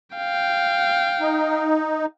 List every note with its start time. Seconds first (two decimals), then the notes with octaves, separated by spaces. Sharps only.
0.16 F5 G5
1.21 D#4